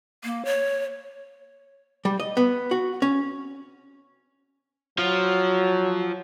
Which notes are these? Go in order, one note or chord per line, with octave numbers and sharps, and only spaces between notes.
A#3
C#5
G3
D#5
B3
F#4
C#4
F3 F#3